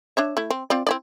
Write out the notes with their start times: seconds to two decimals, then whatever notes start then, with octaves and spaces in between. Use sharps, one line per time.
0.17 D4 C#5 E5
0.37 A3 E4
0.50 C4
0.70 C4 F4 D5
0.87 C4 E4 D5